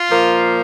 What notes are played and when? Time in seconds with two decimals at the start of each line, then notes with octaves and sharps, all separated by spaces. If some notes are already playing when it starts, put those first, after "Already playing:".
Already playing: F4
0.11 A#2 F3 A#3